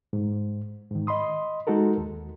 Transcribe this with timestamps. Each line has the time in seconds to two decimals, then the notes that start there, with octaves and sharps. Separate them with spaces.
0.13 G#2
0.91 G#2 D#3
1.07 D#5 B5 C6 D#6
1.67 G#3 D#4 F#4 A4 A#4
1.98 D#2